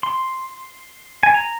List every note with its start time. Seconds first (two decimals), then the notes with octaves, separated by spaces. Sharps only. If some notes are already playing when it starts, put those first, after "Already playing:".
0.03 C6
1.23 G#5
1.34 A#5